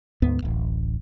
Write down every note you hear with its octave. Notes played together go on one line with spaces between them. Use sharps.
D2 G#2 B3
D1 A1